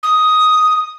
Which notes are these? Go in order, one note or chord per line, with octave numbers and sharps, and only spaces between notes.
D#6